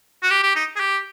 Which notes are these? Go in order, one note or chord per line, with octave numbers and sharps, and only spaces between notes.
F#4
G4
G4
D#4
G#4
G4